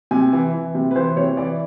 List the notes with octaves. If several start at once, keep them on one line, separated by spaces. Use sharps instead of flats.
C3 G#5
E3
E3
C3
B4
E3 C5
C3 C#5
E3 D5